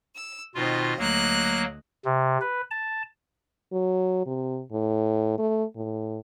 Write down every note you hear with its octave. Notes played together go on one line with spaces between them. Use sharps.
E6
B2 D#3 C4 F4 D#5
D2 F#3 A#3 D#5 F#6
C3
B4
A5
F#3
C3
A2
A3
A2